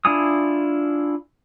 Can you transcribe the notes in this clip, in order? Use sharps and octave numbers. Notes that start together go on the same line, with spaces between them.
D4 E4 F4 G#5 D#6